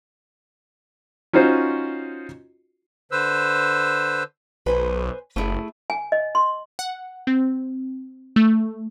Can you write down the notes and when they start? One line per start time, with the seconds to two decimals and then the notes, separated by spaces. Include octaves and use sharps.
1.33 C#4 D#4 F4 F#4 C5
3.12 D3 B4 C5 E6
4.66 B1 B4 C5 G#5
5.36 F#1 A3 E4 G#4
5.90 G#5
6.12 D#5
6.35 C6
6.79 F#5
7.27 C4
8.36 A3